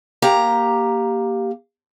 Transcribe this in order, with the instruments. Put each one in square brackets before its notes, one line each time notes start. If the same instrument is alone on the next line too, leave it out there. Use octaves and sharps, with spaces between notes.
[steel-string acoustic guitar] A#3 G4 A#5